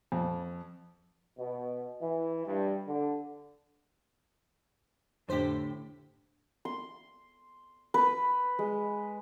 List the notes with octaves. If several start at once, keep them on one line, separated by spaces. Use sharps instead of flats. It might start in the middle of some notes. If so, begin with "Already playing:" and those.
F2
B2
E3
G2
D3
F2 A2 D3 G4 C5 B6
C6
B4
G#3